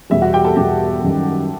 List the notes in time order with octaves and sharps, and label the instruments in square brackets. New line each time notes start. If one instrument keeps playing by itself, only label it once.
[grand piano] E2 B2 G3 [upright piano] E5
[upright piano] F#4 F#5
G4 G5
A4 A5
[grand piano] E2 B2 G3 [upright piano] G4 G5
[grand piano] F#2 D#3 G3